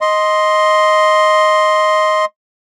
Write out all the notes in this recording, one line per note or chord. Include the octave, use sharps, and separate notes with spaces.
D#5 C6